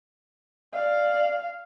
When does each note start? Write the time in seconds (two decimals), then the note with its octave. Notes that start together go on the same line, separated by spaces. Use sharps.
0.74 D5 F5